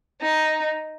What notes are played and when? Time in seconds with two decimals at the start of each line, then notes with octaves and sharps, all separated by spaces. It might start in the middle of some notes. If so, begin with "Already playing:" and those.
0.21 D#4